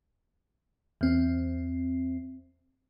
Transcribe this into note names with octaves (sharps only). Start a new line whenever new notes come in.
E2 C4